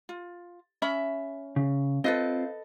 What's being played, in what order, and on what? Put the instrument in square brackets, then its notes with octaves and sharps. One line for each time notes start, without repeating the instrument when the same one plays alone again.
[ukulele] F4
C#4 E5 B5
[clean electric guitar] C#3
[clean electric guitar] C4 F4 [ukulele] A4 B4 D#5